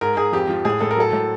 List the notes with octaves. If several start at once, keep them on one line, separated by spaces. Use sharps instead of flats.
G#2 A#4
G#2 G#4
F2 G4
F3
A2 G#4
A2 A4
A#4
F#3 A4
A2